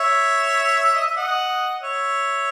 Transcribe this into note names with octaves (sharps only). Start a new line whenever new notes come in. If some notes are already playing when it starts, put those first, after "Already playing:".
Already playing: C#5 E5
D#5
E5
D#5 F#5
C#5 E5